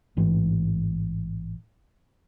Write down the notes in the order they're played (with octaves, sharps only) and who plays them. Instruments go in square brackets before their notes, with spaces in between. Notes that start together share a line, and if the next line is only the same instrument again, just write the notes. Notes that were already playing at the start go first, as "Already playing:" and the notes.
[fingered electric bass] A1 G#2 E3